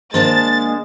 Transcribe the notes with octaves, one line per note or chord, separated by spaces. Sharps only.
D#3 G#3 A#3 D4 C5 A5 A#5 A6